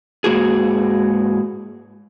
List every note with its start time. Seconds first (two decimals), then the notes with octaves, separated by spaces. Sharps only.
0.24 G#2 A#3 F#4 G#4